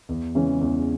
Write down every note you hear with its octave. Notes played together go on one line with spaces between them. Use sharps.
E2
C#3 E3 G#3 C#4
E2